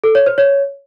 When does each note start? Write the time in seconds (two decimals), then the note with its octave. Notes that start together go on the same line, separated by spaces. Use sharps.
0.04 A4
0.15 C#5
0.26 C5
0.38 C#5